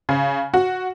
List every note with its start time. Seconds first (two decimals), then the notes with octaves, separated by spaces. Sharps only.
0.09 C#3
0.54 F#4